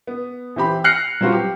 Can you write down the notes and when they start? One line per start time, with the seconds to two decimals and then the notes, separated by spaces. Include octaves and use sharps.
0.07 B3
0.56 E3 C4 G4 B5
0.84 F6 F#6 A#6 C7 C#7 F#7
1.21 F#3 G3 C4 F4 F#4 B4
1.33 G4